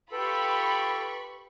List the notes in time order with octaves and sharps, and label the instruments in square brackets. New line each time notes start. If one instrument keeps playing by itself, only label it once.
[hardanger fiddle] F4 G4 [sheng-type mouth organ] A4 [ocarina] B4 [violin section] B5 C#6